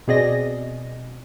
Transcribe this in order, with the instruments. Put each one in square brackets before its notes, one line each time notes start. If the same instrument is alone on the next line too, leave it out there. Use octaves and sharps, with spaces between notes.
[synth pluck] B2 C4 G#4 D5 D#5 A#6